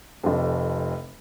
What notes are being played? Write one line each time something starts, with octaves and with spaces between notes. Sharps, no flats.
F1 F2